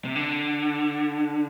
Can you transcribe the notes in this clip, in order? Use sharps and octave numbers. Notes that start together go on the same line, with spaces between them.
C3
D3